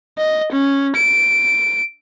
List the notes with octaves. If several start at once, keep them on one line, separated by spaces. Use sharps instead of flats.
D#5
C#4
D7